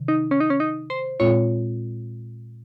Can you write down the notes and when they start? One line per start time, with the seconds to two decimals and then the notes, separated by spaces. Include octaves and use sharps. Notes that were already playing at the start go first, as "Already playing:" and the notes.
Already playing: C3 D#3
0.08 D#4
0.31 C#4
0.40 D#4
0.50 C#4
0.60 D#4
0.90 C5
1.20 A#2 G#3 C4 F4 C#5